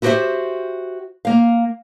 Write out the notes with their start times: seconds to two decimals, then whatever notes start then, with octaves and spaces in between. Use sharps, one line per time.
0.02 E4 F#4 G4 A#4 C5 E5
1.25 A#3 F5